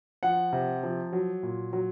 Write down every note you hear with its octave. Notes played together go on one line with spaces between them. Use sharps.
F3 F#5
C3
F3
F#3
A#2
F#3